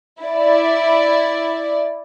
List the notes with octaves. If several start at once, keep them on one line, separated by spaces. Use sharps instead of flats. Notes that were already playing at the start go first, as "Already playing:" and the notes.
E4 D5